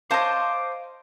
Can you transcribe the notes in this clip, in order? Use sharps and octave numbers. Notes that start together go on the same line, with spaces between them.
C5 C#5 D#5 F5 A5 D6